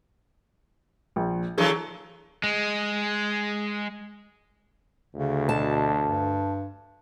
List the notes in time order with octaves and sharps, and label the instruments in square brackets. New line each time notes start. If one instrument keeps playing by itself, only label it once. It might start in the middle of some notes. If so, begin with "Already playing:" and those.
[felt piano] A#1
[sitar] D3 E3 F#3 [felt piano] G#4
[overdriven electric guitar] G#3
[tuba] D2 [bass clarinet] C#3
[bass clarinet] B2 [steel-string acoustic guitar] A5
[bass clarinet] G2